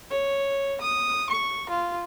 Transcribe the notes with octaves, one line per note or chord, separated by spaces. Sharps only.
C#5
D#6
C#6
F4